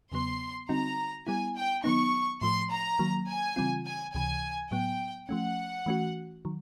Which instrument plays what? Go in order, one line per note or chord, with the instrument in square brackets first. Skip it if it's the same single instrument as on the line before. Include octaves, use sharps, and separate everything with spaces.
[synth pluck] E2 C#3 F#3 B3 [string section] C6
[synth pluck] D3 G3 C4 D#4 F#4 [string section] A#5
[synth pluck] G3 B3 E4 [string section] G#5
[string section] G5
[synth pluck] D#3 F#3 B3 D#4 [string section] C#6
[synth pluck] A2 F3 A3 [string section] C6
[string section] A#5
[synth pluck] D#3 F#3 A#3
[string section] G#5
[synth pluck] C#3 E3 G3 C4 F4
[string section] G#5
[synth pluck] C#2 C3 E3 [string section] G#5
[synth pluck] A2 F#3 B3 [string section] G5
[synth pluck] F3 A3 C#4 [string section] F#5
[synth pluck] E3 A3 C#4 F#4
D#3 F#3